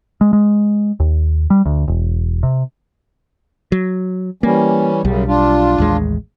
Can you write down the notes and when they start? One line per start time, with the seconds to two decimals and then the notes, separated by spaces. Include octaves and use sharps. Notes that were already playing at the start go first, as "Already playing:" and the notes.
0.21 G#3
0.33 G#3
1.00 D#2
1.50 G3
1.66 D2
1.88 E1
2.43 C3
3.72 F#3
4.43 E3 G3 A#3 C#4
5.05 B1 F#2 C#3 G3
5.28 D4 F4
5.78 A1 D#2 G#3